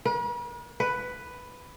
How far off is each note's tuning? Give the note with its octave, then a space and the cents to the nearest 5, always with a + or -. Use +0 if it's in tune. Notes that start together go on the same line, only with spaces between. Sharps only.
B4 -45
B4 +5